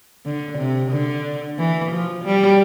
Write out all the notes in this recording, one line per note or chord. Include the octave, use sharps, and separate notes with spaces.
D3
C3
D3
E3
F3
G3